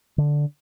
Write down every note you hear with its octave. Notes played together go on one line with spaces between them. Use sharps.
D3